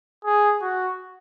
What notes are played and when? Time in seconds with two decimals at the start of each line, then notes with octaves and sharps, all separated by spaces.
0.25 G#4
0.62 F#4